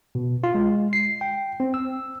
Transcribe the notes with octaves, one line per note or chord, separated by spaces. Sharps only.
B2
F4
G#3
C7
G5
C4
E6